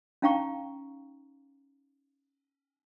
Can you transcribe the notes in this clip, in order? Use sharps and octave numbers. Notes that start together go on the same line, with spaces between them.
C#4 D#4 F5 G5 A#5 C#6